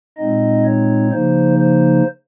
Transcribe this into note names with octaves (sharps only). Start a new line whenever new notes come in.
A#2 G#3 C4 D#4 D#5
C#5
C#3 F3 A#3 D#4 C5
C5